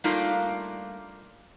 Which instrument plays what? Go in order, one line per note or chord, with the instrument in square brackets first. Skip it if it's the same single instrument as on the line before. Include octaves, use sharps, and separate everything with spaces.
[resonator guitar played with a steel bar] G3 A3 A#3 D4 D#4 F4